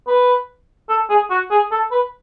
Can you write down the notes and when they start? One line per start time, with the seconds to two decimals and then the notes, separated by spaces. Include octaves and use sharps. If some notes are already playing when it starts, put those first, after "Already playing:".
0.07 B4
0.89 A4
1.10 G#4
1.30 F#4
1.51 G#4
1.71 A4
1.91 B4